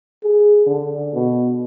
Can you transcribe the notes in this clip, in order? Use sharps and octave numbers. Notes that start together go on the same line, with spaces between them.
G#4
D3
B2